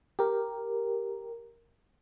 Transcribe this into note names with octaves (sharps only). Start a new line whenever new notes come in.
G4 A#4